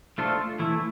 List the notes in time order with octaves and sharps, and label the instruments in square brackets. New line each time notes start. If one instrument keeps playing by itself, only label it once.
[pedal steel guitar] A3 D4 F4 A4 C5
E3 A3 E4